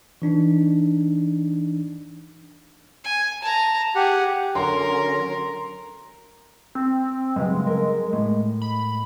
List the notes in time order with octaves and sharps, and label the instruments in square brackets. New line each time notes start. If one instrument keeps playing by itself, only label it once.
[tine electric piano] E3 D4 D#4
[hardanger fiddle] G#5
A5 A#5
[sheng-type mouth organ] G4 F#5 [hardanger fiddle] G#4
[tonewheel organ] D3 F#3 C#4 [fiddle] A#4 [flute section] A#5 [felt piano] C6
[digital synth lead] C4
[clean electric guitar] G2 C#3 F#3 [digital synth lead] G#3
[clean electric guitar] A#4
A2
[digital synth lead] B5